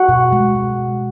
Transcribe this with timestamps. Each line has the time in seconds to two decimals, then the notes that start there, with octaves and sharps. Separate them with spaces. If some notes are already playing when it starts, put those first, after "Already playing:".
Already playing: F#4 F#5
0.09 B2
0.32 G#3
0.55 B2